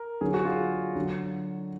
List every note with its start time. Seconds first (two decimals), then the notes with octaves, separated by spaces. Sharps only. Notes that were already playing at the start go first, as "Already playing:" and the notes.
Already playing: A#4
0.21 D3 F#3 G#4
0.34 F#4
0.45 F4 G#4
0.96 D3 F#3